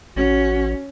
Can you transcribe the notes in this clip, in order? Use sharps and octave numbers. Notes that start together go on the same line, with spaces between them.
A1 C#4 F#4